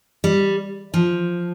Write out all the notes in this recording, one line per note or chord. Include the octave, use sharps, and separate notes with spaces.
G3
F3